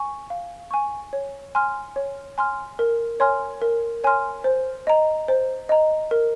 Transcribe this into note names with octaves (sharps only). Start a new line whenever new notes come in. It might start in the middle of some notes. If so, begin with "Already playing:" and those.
Already playing: G#5 C#6
F5
G#5 C#6
C#5
G#5 C6 F6
C#5
G#5 C6 F6
A#4
C#5 G#5 C6 F6
A#4
C#5 G#5 C6 F6
C5
D#5 A#5
C5
D#5 A#5
A#4